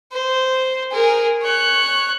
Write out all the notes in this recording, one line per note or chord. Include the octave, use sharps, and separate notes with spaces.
C5
G#4 A#4
C#5 F#6